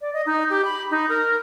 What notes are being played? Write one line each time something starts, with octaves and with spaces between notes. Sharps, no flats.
D5
D#5
D#4
G4
B5
D#4
A#4